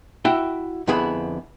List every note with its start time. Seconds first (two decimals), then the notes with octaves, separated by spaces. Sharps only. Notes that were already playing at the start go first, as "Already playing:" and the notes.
0.25 E4 F#4 E5 G5
0.87 F2 D3 B3 E4 G#4 B5